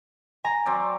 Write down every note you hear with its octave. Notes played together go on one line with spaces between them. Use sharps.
G#5 A#5
F#3 C4 D5